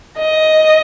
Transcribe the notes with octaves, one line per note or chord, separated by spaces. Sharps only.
D#5